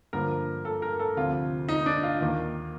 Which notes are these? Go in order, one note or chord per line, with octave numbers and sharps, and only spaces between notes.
G2 D3 F3 A#3 A#4
A4
A#4
A4
D2 C3 F3 F4
D#4
D4
F4
D#2 D#3 A#3